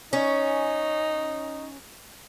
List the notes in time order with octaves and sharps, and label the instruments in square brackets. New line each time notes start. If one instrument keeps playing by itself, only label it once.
[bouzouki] C#4 [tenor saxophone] D#4